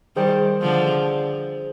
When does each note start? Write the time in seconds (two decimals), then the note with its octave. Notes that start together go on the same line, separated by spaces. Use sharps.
0.16 D#3 G3 G#4 C5 G5
0.62 D3 F3